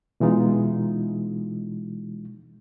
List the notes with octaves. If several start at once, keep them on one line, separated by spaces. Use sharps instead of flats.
B2 E3 G#3 D#4 F4